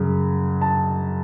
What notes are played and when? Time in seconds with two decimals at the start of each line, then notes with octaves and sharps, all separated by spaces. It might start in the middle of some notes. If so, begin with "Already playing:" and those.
Already playing: F#2 C#3
0.61 A5